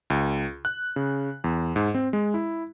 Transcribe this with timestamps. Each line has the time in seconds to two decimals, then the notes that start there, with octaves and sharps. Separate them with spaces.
0.10 C#2
0.65 F#6
0.96 C#3
1.44 E2
1.76 G#2
1.94 C4
2.13 G#3
2.34 E4